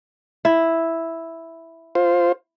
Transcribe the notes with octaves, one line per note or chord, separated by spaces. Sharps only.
E4
F4 C5